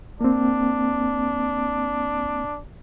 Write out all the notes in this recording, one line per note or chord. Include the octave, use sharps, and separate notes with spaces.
A#3 C4 D4